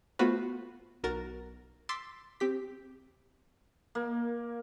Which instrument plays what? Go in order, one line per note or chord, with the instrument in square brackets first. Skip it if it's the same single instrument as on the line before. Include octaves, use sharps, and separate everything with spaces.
[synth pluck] A3 B3 F4 F#4 B4 C5
B1 F#4 A#4 A6
C6 D6 E6 A6 B6
C4 G4 B6
[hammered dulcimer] A#3